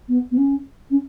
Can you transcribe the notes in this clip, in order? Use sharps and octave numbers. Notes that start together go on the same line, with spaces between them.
B3
B3
C#4
C#4